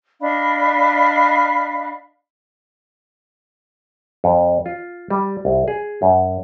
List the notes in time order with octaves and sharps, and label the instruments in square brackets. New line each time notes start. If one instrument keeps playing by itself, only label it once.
[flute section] D4 D#5 F5 B5
[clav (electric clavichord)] F2
F4
G3
C2
G#4
F#2